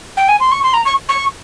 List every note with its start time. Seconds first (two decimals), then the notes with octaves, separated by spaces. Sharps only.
0.17 G5
0.28 G#5
0.40 C6
0.51 C#6
0.63 C6
0.73 A#5
0.85 C#6
1.08 C#6